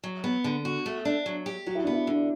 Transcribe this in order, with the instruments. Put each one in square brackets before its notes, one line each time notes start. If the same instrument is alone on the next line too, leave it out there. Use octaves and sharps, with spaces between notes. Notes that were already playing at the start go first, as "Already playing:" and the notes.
[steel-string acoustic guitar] F#3
B3
D3
F#4
A3
D4
F#3
G4
[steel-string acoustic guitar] F#3 [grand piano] F#4
[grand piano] E4
[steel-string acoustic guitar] B3 [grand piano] D4
[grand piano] E4
[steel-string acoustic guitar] D3